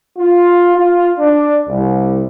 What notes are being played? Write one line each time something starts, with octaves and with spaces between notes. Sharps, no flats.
F4
F4
D4
C2